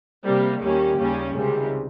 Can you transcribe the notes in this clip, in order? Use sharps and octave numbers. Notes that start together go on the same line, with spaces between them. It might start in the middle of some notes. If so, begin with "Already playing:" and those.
C3 G3 A#3 C4
D#2 D#3 G3 A#3 C#4 G4
D#2 C#3 G3 C#4
C#2 C3 D#3 G3 G#4